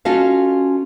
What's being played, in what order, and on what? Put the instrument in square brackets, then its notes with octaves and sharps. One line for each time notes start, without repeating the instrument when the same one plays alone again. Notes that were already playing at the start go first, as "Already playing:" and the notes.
[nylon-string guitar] C#4 F4 F#4 A4 D#5 F5